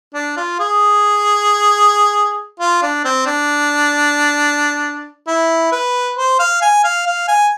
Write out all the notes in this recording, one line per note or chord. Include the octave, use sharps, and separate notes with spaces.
D4
F4
G#4
F4
D4
C4
D4
E4
B4
C5
F5
G#5
F5
F5
G#5